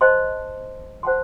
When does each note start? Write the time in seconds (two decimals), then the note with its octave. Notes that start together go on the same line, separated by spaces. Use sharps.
0.01 C5 D#5 A5 C6
1.03 C5 F#5 A5 C6